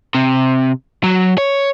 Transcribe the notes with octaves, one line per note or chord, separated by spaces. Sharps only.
C3
F#3
C#5